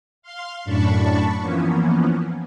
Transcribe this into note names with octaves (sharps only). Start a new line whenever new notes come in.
F5 C6
F#2 A2 D4 A5 B5 C#6
E3 F3 A#3 B3 C#4